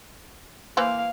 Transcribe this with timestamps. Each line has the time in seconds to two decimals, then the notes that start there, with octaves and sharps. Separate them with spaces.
0.77 E3 A#3 B4 C5 F5